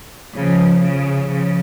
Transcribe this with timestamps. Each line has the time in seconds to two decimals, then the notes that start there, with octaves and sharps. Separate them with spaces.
0.36 C#3 F3
0.83 C#3 F3
1.29 C#3 F3